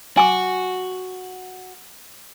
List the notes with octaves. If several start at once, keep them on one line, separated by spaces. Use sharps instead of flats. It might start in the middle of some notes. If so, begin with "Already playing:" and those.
F#4 G#5 D6